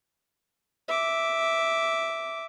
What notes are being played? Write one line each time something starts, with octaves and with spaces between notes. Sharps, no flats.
E5 D6